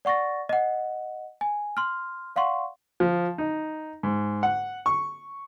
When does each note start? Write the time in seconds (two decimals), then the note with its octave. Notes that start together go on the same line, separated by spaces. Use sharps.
0.05 D5 F#5 C#6 A6 A#6
0.49 D#5 F#5
1.41 G#5
1.77 C6 F6
2.36 D5 F5 F#5 C6 C#6
3.00 F3
3.38 D#4
4.03 G#2
4.43 F#5
4.86 C#6